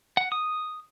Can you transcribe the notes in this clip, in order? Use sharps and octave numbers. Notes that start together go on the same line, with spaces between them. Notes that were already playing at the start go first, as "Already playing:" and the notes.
F#5
D#6